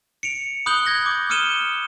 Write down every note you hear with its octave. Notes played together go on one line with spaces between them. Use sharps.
C#7 D7 F7
B5 D#6 F#6 G6 F#7 G7
G6 G#6 A#6 F#7
D6
D#6 F6 C#7 D#7 E7 G7